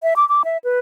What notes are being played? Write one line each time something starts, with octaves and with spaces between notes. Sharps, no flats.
E5
D6
D6
E5
B4